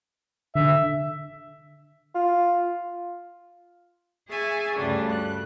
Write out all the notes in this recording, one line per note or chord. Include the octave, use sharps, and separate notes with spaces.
D3 E5
F4
G#4 E5 G#5 C#6 A6
D2 G2 C#3 G3 D4
F#6